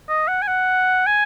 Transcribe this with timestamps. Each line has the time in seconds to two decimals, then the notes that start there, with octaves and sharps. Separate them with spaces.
0.09 D#5
0.28 F#5
0.42 G#5
0.48 F#5
1.07 G#5